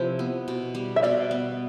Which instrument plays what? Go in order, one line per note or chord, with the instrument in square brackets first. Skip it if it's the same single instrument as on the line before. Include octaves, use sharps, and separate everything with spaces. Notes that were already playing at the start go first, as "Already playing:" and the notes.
Already playing: [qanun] C3 F3 E4 [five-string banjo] C5
[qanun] B3
B2
G3
[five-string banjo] E5
[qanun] B2 [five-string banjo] D5 F5
[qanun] B3